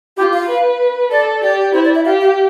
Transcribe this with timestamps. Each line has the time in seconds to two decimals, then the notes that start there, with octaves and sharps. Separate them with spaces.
0.17 F4 G4
0.33 F5
0.49 B4
1.11 A4 D5
1.43 G4 D5
1.73 E4 C5
1.85 D5
1.95 E5
2.05 G4 F5
2.21 F5